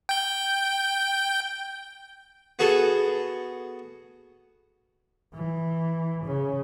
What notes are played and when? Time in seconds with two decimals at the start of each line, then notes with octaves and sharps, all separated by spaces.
0.09 G5 G6
2.59 B3 F#4 G#4 A4
5.34 E3
6.24 C#3